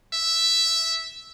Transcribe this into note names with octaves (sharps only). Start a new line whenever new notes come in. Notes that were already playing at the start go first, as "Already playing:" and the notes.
E5